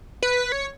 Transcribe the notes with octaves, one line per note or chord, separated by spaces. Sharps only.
B4
C#5